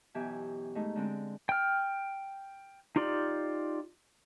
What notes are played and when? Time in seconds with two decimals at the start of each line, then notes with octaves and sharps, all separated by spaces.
0.14 F#2 B2 E3 G4 E5 G#5
0.75 G#2 A3 D#4
0.96 D3 G#3 C4
1.49 G5 F6
2.96 D#4 F4 G4 D5